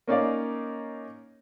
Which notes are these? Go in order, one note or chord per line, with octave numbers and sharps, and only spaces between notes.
A#3 C#4 D#4 D5 F5